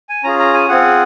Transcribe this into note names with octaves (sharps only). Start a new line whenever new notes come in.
G#5
C#4 F4 G#4 A#5
A#5
G#5
C4 F4 G#4 F#5